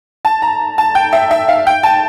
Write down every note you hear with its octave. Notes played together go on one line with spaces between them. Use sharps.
A5
A#5
A5
G5
E5
E5
F5
G5
A5